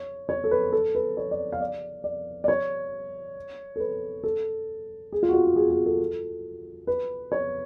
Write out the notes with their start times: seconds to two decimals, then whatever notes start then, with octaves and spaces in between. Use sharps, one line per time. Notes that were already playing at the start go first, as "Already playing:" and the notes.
Already playing: C#5
0.29 C#5
0.44 A4
0.51 B4
0.72 A4
0.95 B4
1.17 C#5
1.31 D5
1.52 F5
1.61 D5
2.04 D5
2.44 D5
2.48 C#5
3.76 A4
3.80 B4
4.24 A4
5.13 G#4
5.23 F4
5.29 F#4
5.34 F4
5.44 F#4
5.56 G#4
5.70 G#4
5.86 A4
6.87 B4
7.32 C#5